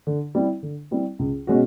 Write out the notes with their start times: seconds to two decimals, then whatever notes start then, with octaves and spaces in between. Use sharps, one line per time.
0.07 D3
0.35 G3 C4 E4
0.63 D3
0.91 G3 C4 E4
1.19 C#2
1.47 B2 G#3 C#4 F#4